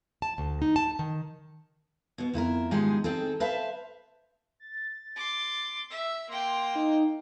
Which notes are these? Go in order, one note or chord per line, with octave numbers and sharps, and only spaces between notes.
A5
D2
D#4
A5
D#3
B2 B3
F2 E4 A4 A#4
G#2 D#3 F3 G#3 G4 G#4
D#3 C4 G#4 A4
B4 C5 E5 F5 A5
A6
C6 D6
E5 E6
A#3 G5 C6
D#4